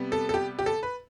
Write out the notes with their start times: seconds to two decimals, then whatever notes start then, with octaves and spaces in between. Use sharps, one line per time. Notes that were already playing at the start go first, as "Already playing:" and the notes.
Already playing: C3 G3 B3
0.12 A4
0.29 A4
0.34 G4
0.59 G4
0.66 A4
0.83 B4